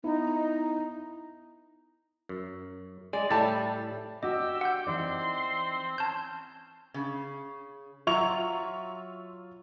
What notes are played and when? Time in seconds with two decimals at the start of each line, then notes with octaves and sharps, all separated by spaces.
0.04 B3 D#4 E4
2.29 F#2
3.13 G#3 D5
3.30 A2 G3 E4 D5 A5
4.23 D4 F#4 G4 D#5 E6
4.61 F#5 G6
4.87 E3 C4 D#4 D5 C6
5.98 C#4 A5 G6
6.94 C#3
8.07 F#3 F4 E5 A#5 C#6 F7